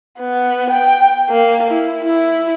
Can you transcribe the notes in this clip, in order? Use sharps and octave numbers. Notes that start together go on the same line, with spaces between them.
B3
G5
A#3
E4
E4